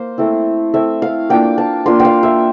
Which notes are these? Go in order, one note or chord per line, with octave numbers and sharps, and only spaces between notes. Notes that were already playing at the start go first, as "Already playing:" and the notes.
Already playing: A#3 C5
A3 C4 E4
A3 C4 E4 E5
F5
A#3 D4 F4 G5
A5
A#3 D4 F4 C6
G5
F5
E5